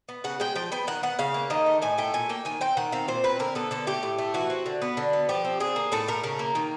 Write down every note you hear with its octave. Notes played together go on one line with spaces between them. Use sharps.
B3
C#3 F#5
G#3 G5
F3 G5
B3 G5
D#3 F#5
B3 F#5
C#3 F5
A#3
D#3 D#5
A3
A2 G#5
A3 G5
A#2 G#5
A#3 G5
D#3 G#5
C4 G5
D#3 F#5
C4 F5
A#2 C5
C4 B4
D3 A#4
B3 A4
D3 A4
A3 G4
A2
A3
E3 F#4
C4
D3
B3
D3
B3
F3 G4
C4
D3 G#4
A#3
A2 A4
A3 A#4
C#3 A#4
A#3
D#3